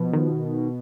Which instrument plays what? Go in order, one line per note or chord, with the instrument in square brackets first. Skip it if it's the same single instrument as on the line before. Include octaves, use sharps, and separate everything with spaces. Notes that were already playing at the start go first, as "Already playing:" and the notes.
Already playing: [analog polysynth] B2 [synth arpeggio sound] F3 B3
[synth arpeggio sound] D#3